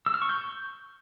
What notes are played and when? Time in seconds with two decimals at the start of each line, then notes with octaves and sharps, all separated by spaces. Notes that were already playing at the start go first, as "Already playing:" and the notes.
0.06 E6
0.14 F6
0.22 C#6
0.29 G6